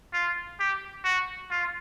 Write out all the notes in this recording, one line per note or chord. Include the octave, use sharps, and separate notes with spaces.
F4
G4
F#4
F4